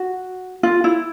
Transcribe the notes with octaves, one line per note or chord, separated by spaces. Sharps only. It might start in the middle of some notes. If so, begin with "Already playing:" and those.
Already playing: F#4
F4
E4